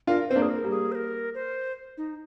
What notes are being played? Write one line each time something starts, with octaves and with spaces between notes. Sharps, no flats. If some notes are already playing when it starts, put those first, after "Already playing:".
D4 F4 A#4
C4 C5
A#3 D4
G#4
A#4
G3 A#3
G#4
C5
A#4
C5
D#4